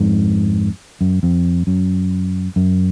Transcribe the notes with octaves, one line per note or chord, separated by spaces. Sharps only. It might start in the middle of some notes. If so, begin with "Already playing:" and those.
Already playing: F2 G#2
F#2
F2
F#2
F#2